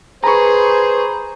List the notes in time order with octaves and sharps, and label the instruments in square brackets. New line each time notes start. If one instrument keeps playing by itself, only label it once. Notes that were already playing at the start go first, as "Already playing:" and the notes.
[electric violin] G#4 [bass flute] B4 [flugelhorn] C5 [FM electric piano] A#5 B5 C#6